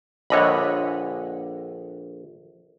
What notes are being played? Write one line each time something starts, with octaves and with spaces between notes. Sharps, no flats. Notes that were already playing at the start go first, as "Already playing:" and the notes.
A#1 D3 C#5 D#5 B5